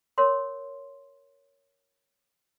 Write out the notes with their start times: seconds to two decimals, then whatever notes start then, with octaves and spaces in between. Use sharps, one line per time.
0.18 A#4 C#5 C6